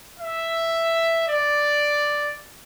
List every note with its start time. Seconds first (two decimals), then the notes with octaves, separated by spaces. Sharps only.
0.19 E5
1.29 D5